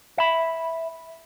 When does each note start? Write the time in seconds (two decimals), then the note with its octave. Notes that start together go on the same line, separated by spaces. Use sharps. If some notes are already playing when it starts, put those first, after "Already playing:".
0.18 E5 B5